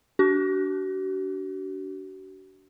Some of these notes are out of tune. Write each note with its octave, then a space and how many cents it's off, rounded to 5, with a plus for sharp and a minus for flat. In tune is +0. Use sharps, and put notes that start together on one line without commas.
D4 -20 F#4 +40